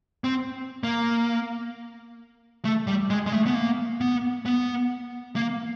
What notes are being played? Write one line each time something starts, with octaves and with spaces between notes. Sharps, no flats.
C4
A#3
A3
G3
G#3
G#3
A3
B3
A#3
B3
B3
A#3